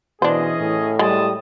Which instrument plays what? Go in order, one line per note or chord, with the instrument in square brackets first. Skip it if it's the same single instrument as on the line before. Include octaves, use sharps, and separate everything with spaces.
[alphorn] B2 [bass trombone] E3 [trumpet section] C#4 G#4 D#5 [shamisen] D4 C5
[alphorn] A2
[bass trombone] G3 [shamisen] G#3 [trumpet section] D#5 A5 D#6